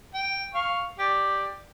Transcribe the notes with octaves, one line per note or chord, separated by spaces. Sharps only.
G5
F5 C#6
G4 D5